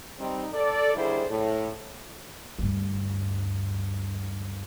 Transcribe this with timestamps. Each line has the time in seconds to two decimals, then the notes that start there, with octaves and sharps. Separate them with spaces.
0.19 G3 C4 D#4
0.52 A4 D5
0.95 D#2 D3 G3 E4 G#4 C5
1.29 A2
2.59 D2 G2